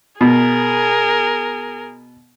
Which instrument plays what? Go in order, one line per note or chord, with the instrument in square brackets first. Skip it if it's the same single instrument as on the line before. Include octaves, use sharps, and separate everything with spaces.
[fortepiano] B2 [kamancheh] G#4 A#4